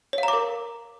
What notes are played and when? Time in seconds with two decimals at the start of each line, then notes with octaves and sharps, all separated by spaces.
0.13 C#5
0.18 F5
0.23 A#5
0.28 D6
0.33 A#4